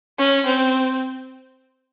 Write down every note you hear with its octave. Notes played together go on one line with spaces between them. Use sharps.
C#4
C4